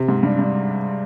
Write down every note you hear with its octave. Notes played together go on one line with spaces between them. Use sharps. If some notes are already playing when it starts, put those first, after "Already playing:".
Already playing: C3
G#2
G2
G2